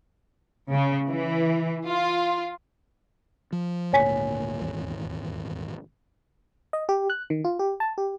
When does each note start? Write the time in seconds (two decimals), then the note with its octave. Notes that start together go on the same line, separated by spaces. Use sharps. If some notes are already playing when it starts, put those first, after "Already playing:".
0.71 C#3
1.06 E3
1.87 F4
3.52 F3
3.93 G#1 D2 A#2 C#5 G#5 B6
4.62 D#1 G#1 E2
6.73 D#5
6.89 G4
7.10 F#6
7.30 D#3
7.44 F4
7.59 G4
7.80 A5
7.98 G4